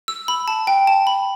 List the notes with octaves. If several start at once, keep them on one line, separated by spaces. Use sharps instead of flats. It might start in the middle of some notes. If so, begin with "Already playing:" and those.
E6
B5
A5
G5
A5
B5